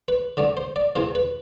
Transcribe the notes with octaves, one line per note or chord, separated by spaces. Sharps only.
B4
F#2 D3 D5
C5
D5
E2 C3 E3 C5
B4